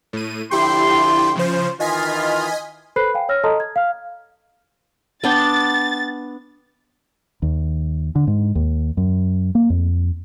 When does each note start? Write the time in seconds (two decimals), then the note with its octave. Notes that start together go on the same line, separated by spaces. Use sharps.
0.13 A2 D#7
0.51 D3 F3 E4 G4 G5 C6
1.35 C#3 F3 C5
1.80 D#3 E3 F4 D#5 G#5 B6
2.96 A4 B4 C5 B5 F#6 C7
3.14 F5 G5 G#5
3.29 C#5 E6 F6 A#6
3.44 A4 D#5 A5 A#5 C6 D#6
3.60 G#6
3.76 F5 F6
5.24 B3 D4 G5 A6
7.42 D#2
8.15 D3
8.27 G#2
8.55 D#2
8.97 F#2
9.55 A#3
9.70 F2